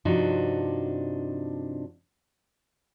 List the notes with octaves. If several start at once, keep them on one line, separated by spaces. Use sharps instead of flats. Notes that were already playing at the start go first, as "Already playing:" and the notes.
G2 C3 F3 D4 D#4 F#4